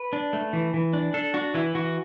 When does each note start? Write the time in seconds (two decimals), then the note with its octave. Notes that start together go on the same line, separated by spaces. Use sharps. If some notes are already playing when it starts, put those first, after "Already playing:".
Already playing: B4
0.13 D4
0.33 A3
0.53 E3
0.74 E3
0.93 D4
1.14 D4 A4
1.34 D4 F#4
1.54 E3 E4
1.75 E3 F#4